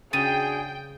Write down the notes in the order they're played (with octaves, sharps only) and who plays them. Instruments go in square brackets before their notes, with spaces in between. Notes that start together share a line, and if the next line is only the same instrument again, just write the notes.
[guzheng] C#3 [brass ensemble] D4 F#4 G#4 [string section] G5 [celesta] A6 D#7